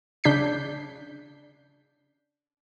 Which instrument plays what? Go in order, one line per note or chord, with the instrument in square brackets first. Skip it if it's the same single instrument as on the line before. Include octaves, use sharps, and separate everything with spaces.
[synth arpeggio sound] C#3 D4 G6 B6 C7